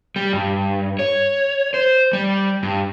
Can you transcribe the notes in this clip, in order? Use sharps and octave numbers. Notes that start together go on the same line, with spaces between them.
G3
G2
C#5
C5
G3
G2